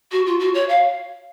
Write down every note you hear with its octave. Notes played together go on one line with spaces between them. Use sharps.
F#4
F4
F#4
C#5
F5